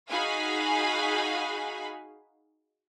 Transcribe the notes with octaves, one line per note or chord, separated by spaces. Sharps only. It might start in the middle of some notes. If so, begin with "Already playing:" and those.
D#4 F#4 G#4 F5 G#5 B5